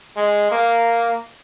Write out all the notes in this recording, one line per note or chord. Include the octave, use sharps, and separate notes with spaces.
G#3
A#3